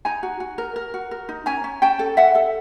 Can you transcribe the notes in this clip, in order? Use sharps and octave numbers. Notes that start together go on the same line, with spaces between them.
D#4 G#5 A#5
F#4
F#4
A#4
A#4
F#4
A#4
D#4
C#4 G#5 A#5
C#4
C#4 G5 A5
A4
A4 E5 F#5
A4